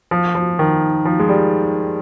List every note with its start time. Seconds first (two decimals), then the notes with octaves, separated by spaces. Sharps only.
0.11 F3
0.35 F3
0.59 D#3
1.05 F3
1.19 G#3
1.29 G3